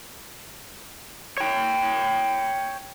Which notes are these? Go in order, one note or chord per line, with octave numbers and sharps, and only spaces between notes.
C#5 G5